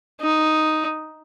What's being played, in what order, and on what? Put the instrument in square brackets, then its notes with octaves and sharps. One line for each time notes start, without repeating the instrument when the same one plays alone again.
[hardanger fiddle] D#4